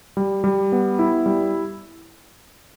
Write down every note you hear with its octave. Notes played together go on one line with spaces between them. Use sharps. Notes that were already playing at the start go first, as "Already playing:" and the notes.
G3
G3
B3
E4
G3